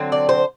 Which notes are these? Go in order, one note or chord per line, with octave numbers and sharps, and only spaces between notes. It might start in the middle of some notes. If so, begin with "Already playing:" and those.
Already playing: D3 F#3 C4
D5
C5